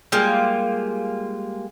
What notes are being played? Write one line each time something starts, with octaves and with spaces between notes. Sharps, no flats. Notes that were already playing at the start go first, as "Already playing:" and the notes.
G3 G#3 A#3 F4